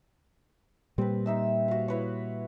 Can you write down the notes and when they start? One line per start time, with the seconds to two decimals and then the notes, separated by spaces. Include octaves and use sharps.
0.98 A#2 G3 C4 B4
1.26 D#4 E5 E6
1.68 F#4 F5
1.88 E4 B4 C#5